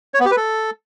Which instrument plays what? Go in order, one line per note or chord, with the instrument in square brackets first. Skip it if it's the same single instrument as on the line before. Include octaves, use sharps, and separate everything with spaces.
[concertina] C#5
B3
G4
B4
A4